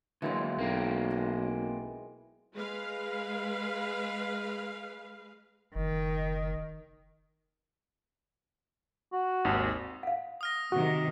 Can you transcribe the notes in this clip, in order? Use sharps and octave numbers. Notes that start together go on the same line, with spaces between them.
D3 E3 F#3 G#3 A#3
B1 A#3 C4 A#4
G#5 C6
G#3 B4 F5
F#1 D#3
F#4
G#1 D#2
F5 F#5
D#6 F6 A#6
C3 D#3 F#4